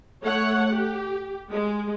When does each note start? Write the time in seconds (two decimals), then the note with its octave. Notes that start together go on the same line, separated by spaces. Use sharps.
0.23 A3 C#5 F#5
0.73 G4
1.52 G#3